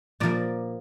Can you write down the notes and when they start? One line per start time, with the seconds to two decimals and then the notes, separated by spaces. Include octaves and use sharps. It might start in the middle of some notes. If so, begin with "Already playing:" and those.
0.20 A#2 F3 A#3 D5